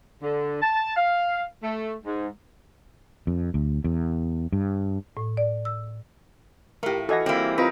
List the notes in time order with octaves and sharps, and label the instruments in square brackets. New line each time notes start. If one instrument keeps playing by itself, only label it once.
[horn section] D3
A5
F5
A3
G#2
[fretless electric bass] F2
D2
E2
G2
[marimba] A2
D5
E6
[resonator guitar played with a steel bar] A2 A3 [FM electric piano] G4 A#4 [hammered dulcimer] F5
[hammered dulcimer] E3 [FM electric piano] F#4 G#6 A#6 [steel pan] A4 D#5 F#5
[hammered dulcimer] G3 E4 [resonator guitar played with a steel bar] A#3 C4
[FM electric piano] C4 F4 [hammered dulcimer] D#4 A#4 [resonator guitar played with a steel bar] B4